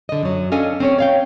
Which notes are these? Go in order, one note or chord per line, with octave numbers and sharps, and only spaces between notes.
D3 D#5
F#2 F#3
C#4 D4 A4 D#5 F5 G#5
C4 C#4 C#5
C#5 F5 G5